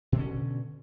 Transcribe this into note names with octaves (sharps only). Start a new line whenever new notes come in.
B2 D3 C#4